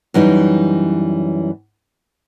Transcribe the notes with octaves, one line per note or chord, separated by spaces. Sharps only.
F#2 E3 G3 D#4